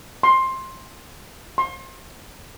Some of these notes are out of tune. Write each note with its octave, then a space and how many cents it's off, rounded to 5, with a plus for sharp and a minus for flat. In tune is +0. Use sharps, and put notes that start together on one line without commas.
C6 +15
C6 +35